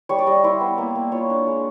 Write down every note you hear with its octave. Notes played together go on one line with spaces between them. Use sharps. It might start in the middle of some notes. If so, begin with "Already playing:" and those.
G3 C#5
D5
G3 D#5
E4 C5
B3
A#3
A#3
F4 C#5
D4
G#3